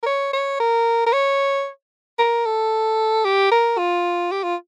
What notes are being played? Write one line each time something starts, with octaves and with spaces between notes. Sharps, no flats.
A#4
C#5
C#5
A#4
A#4
C#5
A#4
A4
G4
A#4
F4
G4
F4